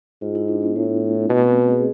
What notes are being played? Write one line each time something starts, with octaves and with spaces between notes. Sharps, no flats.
G#2 F4
E4
D4
B3
A2 A3
B2 A3
C4
G#4